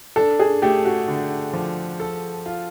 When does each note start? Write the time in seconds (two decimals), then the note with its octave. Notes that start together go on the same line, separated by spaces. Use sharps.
0.16 D4 A4
0.40 G#4
0.62 A3 G4
0.85 F#4
1.08 D3
1.53 F3
2.00 A4
2.46 F4